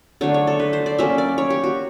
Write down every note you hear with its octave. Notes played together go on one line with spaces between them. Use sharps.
D3 F#3 A3 D4 C#5
C#5
A4
B4
C5
D5
F#3 A#3 C#4 E5
D5
C#5
G4
F#4